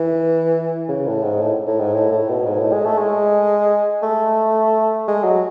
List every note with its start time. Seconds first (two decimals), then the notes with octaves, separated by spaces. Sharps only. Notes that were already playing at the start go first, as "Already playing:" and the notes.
Already playing: E3
0.89 C#3
1.07 A2
1.23 G#2
1.41 A2
1.67 A2
1.80 G#2
1.94 A2
2.11 A2
2.28 B2
2.46 G#2
2.60 A2
2.72 G#3
2.85 A3
2.98 G#3
4.02 A3
5.08 G#3
5.24 F#3